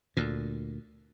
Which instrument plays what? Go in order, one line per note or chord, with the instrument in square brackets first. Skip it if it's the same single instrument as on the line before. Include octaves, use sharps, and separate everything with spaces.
[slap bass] D2 A#2